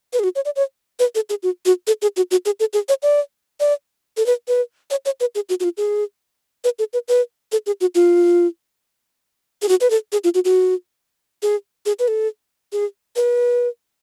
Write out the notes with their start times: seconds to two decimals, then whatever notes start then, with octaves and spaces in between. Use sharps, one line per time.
0.13 B4
0.19 G#4
0.24 F#4
0.36 C#5
0.45 D5
0.56 C#5
1.00 B4
1.15 A4
1.30 G#4
1.43 F#4
1.65 F#4
1.87 A4
2.02 G#4
2.17 F#4
2.31 F#4
2.46 G#4
2.60 A4
2.73 G#4
2.89 C#5
3.03 D5
3.60 D5
4.17 A4
4.26 B4
4.48 B4
4.91 C#5
5.06 C#5
5.20 B4
5.35 G#4
5.49 F#4
5.60 F#4
5.64 F4
5.77 G#4
6.64 B4
6.79 A4
6.93 B4
7.08 B4
7.52 A4
7.67 G#4
7.81 F#4
7.95 F4
9.62 G#4
9.69 F#4
9.81 B4
9.90 A4
10.12 G#4
10.24 F4
10.34 F#4
10.45 F#4
11.43 G#4
11.86 G#4
11.99 B4
12.08 A4
12.73 G#4
13.16 B4